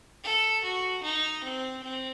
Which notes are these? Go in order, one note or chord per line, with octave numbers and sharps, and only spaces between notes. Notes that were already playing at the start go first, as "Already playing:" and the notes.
A4
F#4
D#4
C4
C4